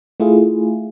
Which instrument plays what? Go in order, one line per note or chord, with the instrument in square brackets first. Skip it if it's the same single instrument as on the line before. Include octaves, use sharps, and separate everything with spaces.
[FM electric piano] A3 E4 F4 G#4